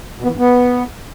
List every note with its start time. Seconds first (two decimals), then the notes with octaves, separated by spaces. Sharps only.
0.19 B2
0.24 B3
0.29 E3
0.34 G2
0.39 B3